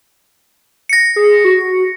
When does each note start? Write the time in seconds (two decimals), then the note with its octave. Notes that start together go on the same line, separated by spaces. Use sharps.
0.89 A#6 C#7
1.16 G#4
1.44 F#4